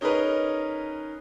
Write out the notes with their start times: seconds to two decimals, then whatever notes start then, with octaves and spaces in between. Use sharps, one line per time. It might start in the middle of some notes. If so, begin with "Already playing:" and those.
0.01 C#4 D#4 G#4 A#4 B4 D#5